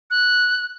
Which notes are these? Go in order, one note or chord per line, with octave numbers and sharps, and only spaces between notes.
F#6